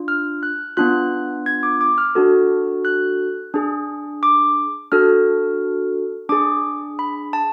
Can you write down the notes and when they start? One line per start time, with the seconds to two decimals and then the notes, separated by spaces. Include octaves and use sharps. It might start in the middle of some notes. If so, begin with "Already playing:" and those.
Already playing: D4 F4
0.08 F6
0.43 F#6
0.77 B3 D4 F4 F#6
1.46 G#6
1.63 D6
1.81 D6
1.98 F6
2.15 D4 F#4 A4
2.85 F#6
3.54 D4 G#4
4.23 D6
4.92 D4 F#4 A4 F6
6.29 D4 G#4 D6
6.99 B5
7.33 A5